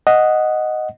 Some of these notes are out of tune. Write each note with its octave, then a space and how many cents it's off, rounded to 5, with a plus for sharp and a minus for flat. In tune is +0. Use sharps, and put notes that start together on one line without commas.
D#5 +0 F#5 +0